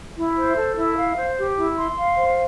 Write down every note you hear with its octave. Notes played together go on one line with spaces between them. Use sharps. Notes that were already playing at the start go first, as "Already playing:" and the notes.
E4
C5
A4
E4
F5
C5
G4
E4
C6
F5
C5